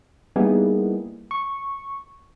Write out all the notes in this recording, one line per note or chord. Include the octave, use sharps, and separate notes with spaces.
G3 A#3 B3 D#4 E4 G#4
C#6